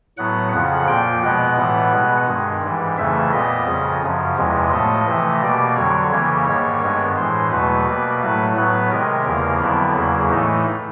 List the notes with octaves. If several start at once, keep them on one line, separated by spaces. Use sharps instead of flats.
A2 F#3 B3 F#5
F2 C#3 F3 F#5
A#2 F3 A#3 G5
B2 G#3 B3 F#5
A2 E3 G3 B3
B2 G#3 B3
G2 D#3 G#3
G#2 E3 G3
F2 C#3 E3 A3 E5
A#2 G3 B3 D#5
F2 C#3 F3
F#2 C#3 F3
E2 C3 F3 G#3
A2 F3 A3 D#5
C3 E3 A3
B2 G3 A#3 D5
F2 D3 F#3 C#5
C#3 E3 G3 A#3 C#5
G#2 D#3 G3 A#3 C#5
G2 D#3 G#3 B3
A2 E3 G#3 C5
E2 B2 F#3 A3 B4
B2 G3 A#3
A2 F#3 A3
A2 F#3 B3 B4
C3 D#3 G#3 A#4
E2 C#3 F3 A#3
F2 D3 F#3 B3 E4
E2 C#3 F#3 A#3
A2 E3 A3 D#4